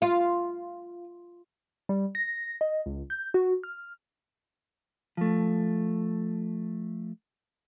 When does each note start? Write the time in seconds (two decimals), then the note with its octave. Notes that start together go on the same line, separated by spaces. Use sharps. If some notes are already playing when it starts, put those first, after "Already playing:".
0.02 F4
1.89 G3
2.15 A#6
2.61 D#5
2.86 C#2
3.10 G6
3.34 F#4
3.63 F6
5.17 F3 A3